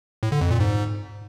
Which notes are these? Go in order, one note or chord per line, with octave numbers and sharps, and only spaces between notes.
A2
D3
F2
A#2
G#2